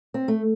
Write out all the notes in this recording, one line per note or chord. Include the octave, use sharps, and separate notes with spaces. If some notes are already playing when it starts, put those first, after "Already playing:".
C4
A3